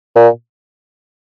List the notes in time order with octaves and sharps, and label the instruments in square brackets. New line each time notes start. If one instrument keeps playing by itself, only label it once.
[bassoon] A#2